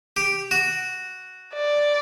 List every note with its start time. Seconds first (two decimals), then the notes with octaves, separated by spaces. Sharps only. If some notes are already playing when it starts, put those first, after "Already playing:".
0.17 G4
0.51 F#4
1.54 D5